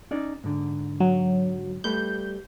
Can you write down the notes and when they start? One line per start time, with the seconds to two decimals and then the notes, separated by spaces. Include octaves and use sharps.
0.11 C#4 D#4 D5
0.44 G#2 D3
1.00 F#3
1.84 G3 A3 B4 G6